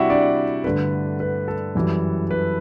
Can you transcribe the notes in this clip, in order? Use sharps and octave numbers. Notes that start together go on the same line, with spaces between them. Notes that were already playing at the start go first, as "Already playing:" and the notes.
Already playing: C3 G3 D4 E4 F#4 G4 E5 F#5
D4 D5
G2 D3 A3 D4 B4
B4
A4
F#2 E3 G3
B4